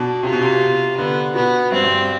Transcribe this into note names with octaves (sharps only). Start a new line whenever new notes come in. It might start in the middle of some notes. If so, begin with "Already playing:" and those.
Already playing: B2 D4
C3 F4
B2
C3
D3 B3
B2 B3
G2 C4
G2